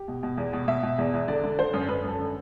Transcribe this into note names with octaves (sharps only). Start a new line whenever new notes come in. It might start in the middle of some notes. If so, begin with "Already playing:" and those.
Already playing: G4
B2
B2
E2
B2
B2 E5
B2
E2
E2
D3 D5
D3
D3 C5
F#2
F#2 B4
F#2 A4
D3